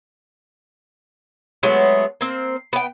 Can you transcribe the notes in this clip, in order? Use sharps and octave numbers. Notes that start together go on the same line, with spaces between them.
F#3 G#3 A3 B3
A#3 C4
B3 G5